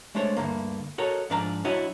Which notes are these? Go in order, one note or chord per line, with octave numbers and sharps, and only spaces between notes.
G#3 A3 D4 C5 C#5
D2 G2 D3 A#3
F#4 A4 A#4 C#5 D#5
G#2 F3 D4 F5 A#5
F#3 D4 E4 F#4 C#5 D#5